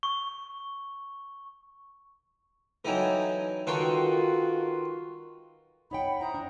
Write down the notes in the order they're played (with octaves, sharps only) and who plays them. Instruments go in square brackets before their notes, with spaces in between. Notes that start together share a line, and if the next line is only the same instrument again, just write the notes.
[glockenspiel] C#6
[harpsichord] E3 F#3 [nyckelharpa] D#4 [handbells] A4 G5 G#5
[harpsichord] D#3 A4 G5 [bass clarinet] F4 [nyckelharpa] F#4 [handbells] B4 C6 C#6
[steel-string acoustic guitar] D#4 C#5 G5 [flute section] F#5 B5
[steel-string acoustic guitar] E4 [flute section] C5 A#5 D#6
[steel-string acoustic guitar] D4